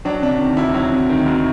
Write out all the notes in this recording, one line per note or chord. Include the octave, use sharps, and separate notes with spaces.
F#3 D4
C3 D4
D#3
D2 E4
F#3
C3
D#3
D2